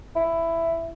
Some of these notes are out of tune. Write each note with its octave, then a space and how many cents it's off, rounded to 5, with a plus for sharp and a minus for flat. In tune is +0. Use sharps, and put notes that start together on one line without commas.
E4 +10